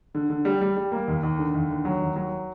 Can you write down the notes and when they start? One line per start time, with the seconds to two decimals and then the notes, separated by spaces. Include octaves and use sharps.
0.15 D3
0.30 D3
0.45 G3
0.62 G3
0.77 G3
0.92 A#3
1.08 D#2
1.23 D#2
1.39 D3
1.54 D#2
1.70 D3
1.85 F#3
2.01 D#2
2.16 F#3